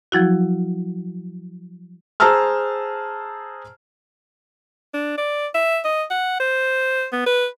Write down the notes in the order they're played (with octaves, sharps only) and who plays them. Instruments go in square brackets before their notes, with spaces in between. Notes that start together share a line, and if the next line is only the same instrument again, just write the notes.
[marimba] F3 F#3 E4 F#4
[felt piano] G#4 C5 A5 A#5 E6 F6
[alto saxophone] D4
D5
E5
D#5
F#5
C5
B3
B4